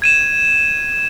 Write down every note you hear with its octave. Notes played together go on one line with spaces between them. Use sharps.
G#6 D#7 E7